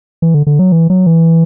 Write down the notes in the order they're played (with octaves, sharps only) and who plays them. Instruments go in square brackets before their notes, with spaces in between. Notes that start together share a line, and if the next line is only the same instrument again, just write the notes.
[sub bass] E3
D3
D3
F#3
E3
F#3
E3